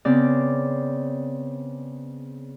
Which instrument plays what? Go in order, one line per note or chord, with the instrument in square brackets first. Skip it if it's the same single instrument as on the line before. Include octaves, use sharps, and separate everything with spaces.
[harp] C#3 B3 C4 D5